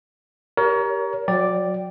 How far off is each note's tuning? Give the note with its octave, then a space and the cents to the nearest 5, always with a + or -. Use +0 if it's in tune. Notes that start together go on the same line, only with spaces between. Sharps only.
G4 +0 A#4 +15 C#5 +35
F#3 -30 D5 +0 G5 -10